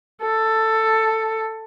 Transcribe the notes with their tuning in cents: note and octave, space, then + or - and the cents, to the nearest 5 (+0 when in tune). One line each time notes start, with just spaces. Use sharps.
A4 +10